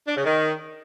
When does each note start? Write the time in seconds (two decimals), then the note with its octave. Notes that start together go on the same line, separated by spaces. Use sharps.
0.08 D4
0.16 C#3
0.25 D#3